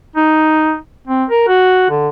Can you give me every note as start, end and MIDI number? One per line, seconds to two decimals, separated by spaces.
0.16 0.76 63
1.07 1.25 60
1.30 1.47 70
1.48 1.88 66
1.90 2.09 50